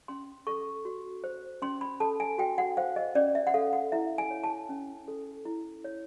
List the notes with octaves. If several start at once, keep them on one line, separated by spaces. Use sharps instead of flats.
C#4 C6
A4 C#6
F#4
C5
C#4 C6
B5
A4 A5
G#5
F#4 G5
F#5
C5 F5
D#5
C#4 D5
E5
F#5
A4 F5
F#5
E4 E5
G#5
C#5
A5
C#4
A4
E4
C#5